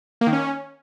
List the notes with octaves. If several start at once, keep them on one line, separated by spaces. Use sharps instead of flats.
A#3
D#3
C#4